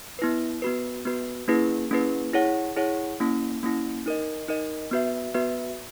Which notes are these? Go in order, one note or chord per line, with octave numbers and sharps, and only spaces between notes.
B3 E4 B4
B3 F#4 B4
B3 F#4 B4
A#3 C#4 E4 G#4 B4
A#3 C#4 E4 G#4 B4
E4 G#4 C#5 F#5
E4 G#4 C#5 F#5
A#3 C#4 E4
A#3 C#4 E4
D#4 A#4 D#5
D#4 A#4 D#5
B3 F#4 B4 E5
B3 F#4 B4 E5